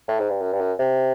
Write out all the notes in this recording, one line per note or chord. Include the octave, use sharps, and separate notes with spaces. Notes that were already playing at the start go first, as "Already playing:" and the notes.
A2
G#2
G2
F#2
G2
F#2
C3